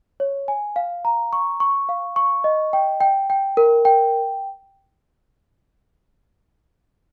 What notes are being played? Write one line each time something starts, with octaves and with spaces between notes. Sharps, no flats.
C#5
G#5
F5
A#5
C#6
C#6
F5
C#6
D#5
G5
G5
G5
A#4
G5